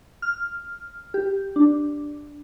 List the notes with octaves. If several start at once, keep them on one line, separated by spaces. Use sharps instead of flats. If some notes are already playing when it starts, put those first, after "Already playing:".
F6
G4
D4